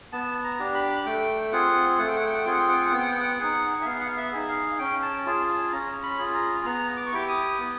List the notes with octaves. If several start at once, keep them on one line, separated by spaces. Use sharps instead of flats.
B3 A5
A#5
D4 G4
B5
A3 G5
C4 F4 G#4 F#5
A3 F#5
G5
F#5
G5
F#5
G5
C4 F4 G#4 F#5
G5
F#5
G5
F#5
B3 G5
F#5
G5
F#5
D#4 G#4
E5
B3 F5
F#5
F5
E5
D#4 G#4
F5
C#4 G5
A5
F4 G#4 A5
A5
C#4 A#5
B5
F4 G#4
A#5
B3 A#5
D6
C#6
E4 G4 D6
D#6
B3